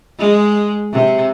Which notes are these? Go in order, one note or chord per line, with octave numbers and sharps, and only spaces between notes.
G#3
C3